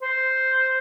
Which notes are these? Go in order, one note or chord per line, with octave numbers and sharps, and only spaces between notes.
C5